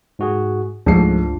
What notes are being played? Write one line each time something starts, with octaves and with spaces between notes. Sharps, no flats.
G#2 F#4 G#4
C#2 G#2 F3 A3 D4 F4 C7